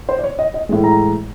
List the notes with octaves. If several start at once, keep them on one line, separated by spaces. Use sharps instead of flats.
C5
D5
C#5
D#5
D#5
A2 E3 G#3
A#5